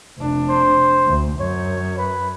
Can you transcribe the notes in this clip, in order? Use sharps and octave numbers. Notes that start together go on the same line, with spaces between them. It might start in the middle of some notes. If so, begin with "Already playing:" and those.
F1 D4
C5
D2
F#2 C#5
B4